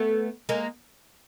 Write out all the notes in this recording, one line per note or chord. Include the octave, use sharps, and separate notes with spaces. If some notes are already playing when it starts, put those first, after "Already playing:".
Already playing: A3 B3
G#3 A#3